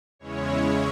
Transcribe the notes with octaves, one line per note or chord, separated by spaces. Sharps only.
E2 C#3 G#3 C#4 E4 C#5